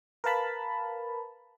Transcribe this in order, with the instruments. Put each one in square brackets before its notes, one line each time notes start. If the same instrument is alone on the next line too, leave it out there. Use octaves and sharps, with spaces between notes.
[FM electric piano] A#4 B4 F5 A5 B5